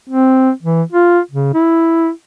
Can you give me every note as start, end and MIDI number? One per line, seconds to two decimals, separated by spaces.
0.09 0.51 60
0.63 0.83 52
0.92 1.20 65
1.31 1.54 49
1.54 2.10 64